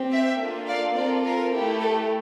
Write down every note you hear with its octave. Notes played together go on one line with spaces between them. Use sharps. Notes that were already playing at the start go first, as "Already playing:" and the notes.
Already playing: C4 G4
E5 G5
A#3 D4 F4 A4
D5 F5
C4 F4 A4 A#4 D5
A#4
A3 E4 G4
A4